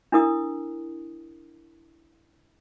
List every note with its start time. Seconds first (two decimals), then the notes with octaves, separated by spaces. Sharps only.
0.12 D4 E4 A#4 D#6